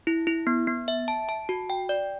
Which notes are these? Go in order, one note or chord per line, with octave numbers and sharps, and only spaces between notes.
E4
E4
B3
B3
E5
A5
A5
F#4
G5
D5